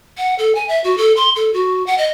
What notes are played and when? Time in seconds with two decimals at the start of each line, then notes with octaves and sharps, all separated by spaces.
0.18 F#5
0.39 A4
0.55 G#5
0.69 E5
0.84 F#4
0.98 A4
1.17 C6
1.36 A4
1.54 F#4
1.86 F#5
1.98 D#5